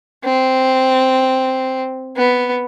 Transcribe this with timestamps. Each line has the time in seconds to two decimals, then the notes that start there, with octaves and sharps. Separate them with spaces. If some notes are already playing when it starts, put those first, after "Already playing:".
0.24 C4
2.17 B3